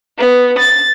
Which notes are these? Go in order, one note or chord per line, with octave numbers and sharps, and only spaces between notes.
B3
A6